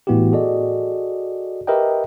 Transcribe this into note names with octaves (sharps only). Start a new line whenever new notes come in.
A2 E3 B3 E4 F#4 G4
F#4 G#4 A4 D5 D#5
G4 A#4 B4 D#5 E5 G5